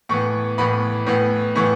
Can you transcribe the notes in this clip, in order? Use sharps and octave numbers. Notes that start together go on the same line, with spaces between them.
A2 E3 B3 C#6
A2 E3 B3 B5
A2 E3 B3
A2 E3 B3 C#6